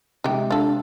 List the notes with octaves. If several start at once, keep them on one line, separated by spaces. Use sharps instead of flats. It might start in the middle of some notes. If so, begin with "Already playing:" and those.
C3 G#3 D#4 G4
D4 F4 A4